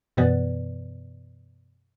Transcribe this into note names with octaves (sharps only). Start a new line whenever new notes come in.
F#2 B2 E3 B3 B4 D5